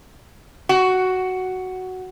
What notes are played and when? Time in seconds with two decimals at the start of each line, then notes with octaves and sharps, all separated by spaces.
0.69 F#4